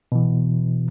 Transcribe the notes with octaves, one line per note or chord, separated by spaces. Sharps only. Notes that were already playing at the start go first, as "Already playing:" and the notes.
B2 E3